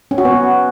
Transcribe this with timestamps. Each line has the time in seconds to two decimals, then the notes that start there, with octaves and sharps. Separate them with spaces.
0.11 C#4
0.18 F#4
0.25 B3